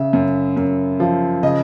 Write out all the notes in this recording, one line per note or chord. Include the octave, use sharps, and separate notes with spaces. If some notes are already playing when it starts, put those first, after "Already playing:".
Already playing: C#3 E5
F#2
F#2
F3
C#3 D#5